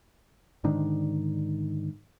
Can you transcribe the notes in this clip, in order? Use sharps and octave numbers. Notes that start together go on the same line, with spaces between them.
G#2 D3 D#3 D4